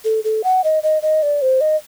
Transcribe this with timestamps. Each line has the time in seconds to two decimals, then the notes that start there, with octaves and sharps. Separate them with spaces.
0.05 A4
0.24 A4
0.44 F#5
0.64 D#5
0.83 D#5
1.02 D#5
1.23 D5
1.42 C5
1.61 D#5